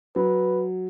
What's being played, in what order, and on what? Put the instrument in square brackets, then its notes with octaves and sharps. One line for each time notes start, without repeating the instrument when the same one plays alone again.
[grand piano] F#3 [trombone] B4